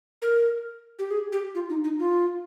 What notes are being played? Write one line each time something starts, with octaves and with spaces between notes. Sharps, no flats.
A#4
G4
G#4
G4
F4
D#4
D#4
F4